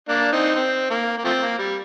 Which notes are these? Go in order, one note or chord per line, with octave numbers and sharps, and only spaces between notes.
A#3 D4
C4 D#4
C4
A#3
A#3
F3 A3 C4
A#3
G3